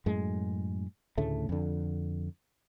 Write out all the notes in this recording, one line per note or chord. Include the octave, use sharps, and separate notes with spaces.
F#2 A2 G#3
D2 A2 C#3 A3
F2 D3